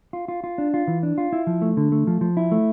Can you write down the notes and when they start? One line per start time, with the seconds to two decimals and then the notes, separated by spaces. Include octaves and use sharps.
0.13 F4
0.28 F4
0.44 F4
0.58 D4
0.74 F4
0.88 E3
1.03 D4
1.18 F4
1.33 E4
1.47 F3
1.62 A3
1.77 D3
1.92 A3
2.07 F3
2.21 F3
2.37 E4
2.52 A3